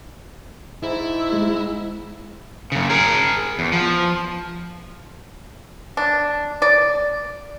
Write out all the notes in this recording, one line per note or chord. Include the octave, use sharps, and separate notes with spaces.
G#2 E4
G#3
F#2 C#3
G#4 A#4
E2
F3
D4
D5